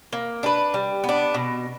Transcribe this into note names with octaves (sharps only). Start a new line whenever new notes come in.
A#3
D4 G4 B4
G3
B3
D4
B2